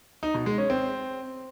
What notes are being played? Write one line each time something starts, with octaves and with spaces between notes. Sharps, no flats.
D#4
B2
G#3
C#4
C4